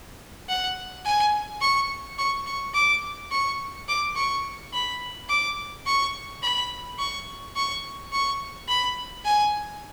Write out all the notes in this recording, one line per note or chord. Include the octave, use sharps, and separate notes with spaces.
F#5
G#5
C#6
C#6
C#6
D6
C#6
D6
C#6
B5
D6
C#6
B5
C#6
C#6
C#6
B5
G#5